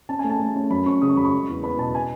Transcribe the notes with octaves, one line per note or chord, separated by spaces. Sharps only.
C#4 A5
A3 G#5
A5
A3
C#4
F#2 B5
C#4 C#6
C#3 D#6
C#6
F#2 B5
C#6
G#3
E2
B3 B5
B2 A5
G#5